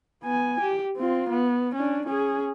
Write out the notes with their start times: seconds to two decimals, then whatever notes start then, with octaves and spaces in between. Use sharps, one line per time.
0.23 B3 G#5
0.60 G4
0.97 C4 F4
1.29 B3
1.75 C#4 D4
2.07 C#4 G#4